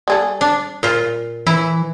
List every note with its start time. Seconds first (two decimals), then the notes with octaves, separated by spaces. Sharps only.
0.08 G3 G#4 A4
0.41 D4
0.83 A#2 F4
1.47 E3 E4